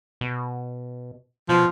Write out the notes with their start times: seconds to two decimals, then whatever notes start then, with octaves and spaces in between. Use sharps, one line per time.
0.21 B2
1.49 B2 F3